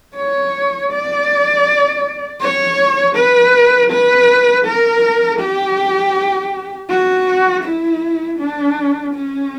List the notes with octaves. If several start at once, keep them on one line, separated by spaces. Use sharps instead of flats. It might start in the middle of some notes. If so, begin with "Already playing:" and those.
C#5
D5
C#5
B4
B4
A#4
G4
F#4
E4
D4
C#4